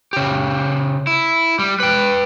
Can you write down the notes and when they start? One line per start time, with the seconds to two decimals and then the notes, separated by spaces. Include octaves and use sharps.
0.13 C#3 G4
1.07 E4
1.59 G3
1.80 B4 G5